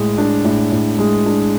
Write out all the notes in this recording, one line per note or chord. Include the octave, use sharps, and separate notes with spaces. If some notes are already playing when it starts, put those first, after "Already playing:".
Already playing: A2 G#3
D4
A2
A2
G#3
D4